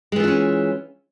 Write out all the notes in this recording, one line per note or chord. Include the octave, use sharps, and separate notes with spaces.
E3 G#3 C#4 D4 F4